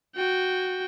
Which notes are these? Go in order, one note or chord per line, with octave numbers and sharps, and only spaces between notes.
F#4 G5